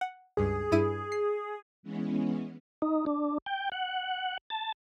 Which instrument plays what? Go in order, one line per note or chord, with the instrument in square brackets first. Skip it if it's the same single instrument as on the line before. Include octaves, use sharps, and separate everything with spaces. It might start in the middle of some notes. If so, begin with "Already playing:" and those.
[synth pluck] F#5
[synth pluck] C#2 G2 [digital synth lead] G#4
[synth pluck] G2 E4 D#7
C7
[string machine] E3 G#3 B3 C#4
[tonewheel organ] D#4
D4
G5
F#5
A5